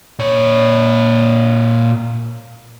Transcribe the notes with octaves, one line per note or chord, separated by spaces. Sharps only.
A#2 C#5